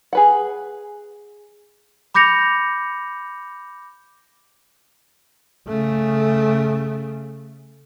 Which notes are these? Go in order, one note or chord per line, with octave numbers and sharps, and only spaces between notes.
G#4 B4 F#5
B5 D6 G6 A#6 C#7 F7
C#3 A3